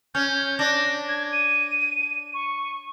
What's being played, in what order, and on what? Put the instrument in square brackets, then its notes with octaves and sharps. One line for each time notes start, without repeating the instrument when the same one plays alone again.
[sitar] C#4 [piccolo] G6
[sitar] D4 [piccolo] A#6
[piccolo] G#6
D#7
C#6